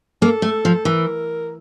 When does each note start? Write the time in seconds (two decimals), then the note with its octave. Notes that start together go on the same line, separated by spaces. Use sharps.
0.22 A#3 A4
0.42 A3
0.65 F3
0.85 E3 A#4